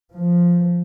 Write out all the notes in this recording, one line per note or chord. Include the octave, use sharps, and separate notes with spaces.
F3